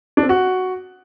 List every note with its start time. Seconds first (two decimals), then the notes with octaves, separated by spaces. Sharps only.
0.17 D4
0.23 C4
0.29 F#4